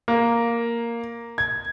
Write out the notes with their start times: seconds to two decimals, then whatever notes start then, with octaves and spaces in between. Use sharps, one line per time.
0.08 A#3
1.38 G#6